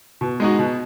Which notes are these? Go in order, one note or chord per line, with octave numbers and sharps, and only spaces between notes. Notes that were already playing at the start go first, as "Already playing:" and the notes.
B2
G#3 D#4 F#4
B2